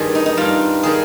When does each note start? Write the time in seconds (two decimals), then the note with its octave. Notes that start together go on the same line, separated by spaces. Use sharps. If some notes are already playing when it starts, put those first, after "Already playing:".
Already playing: G2 D#3 G3 C4 G#4
0.15 D#4
0.26 D#4
0.37 G2 G3 F4
0.83 D#3 G3 G#4